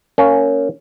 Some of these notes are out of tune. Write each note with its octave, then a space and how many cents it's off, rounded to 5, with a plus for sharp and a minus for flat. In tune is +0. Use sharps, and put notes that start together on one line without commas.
A#3 -10 C#4 +5